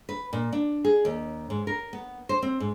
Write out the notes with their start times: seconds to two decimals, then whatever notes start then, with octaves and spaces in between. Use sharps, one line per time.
0.09 B4
0.33 A#2
0.52 D4
0.85 G#4
1.05 D#2
1.50 G#2
1.67 A#4
1.93 B3
2.29 C5
2.42 C4
2.60 G#2